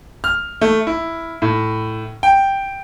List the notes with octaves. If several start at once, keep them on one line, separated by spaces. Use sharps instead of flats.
F6
A3
E4
A2
G5